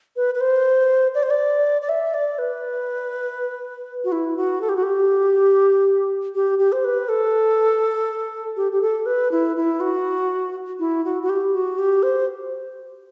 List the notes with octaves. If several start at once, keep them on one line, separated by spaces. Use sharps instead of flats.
B4
B4
C5
D5
C5
D5
D5
E5
D5
B4
F#4
E4
F#4
A4
G4
F#4
G4
G4
G4
C5
B4
A4
G4
G4
A4
B4
E4
E4
F#4
E4
F#4
F#4
G4
F#4
G4
C5